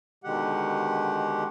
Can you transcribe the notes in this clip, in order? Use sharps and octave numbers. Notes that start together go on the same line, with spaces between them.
B2 D3 D#3 G#3 G4 F#5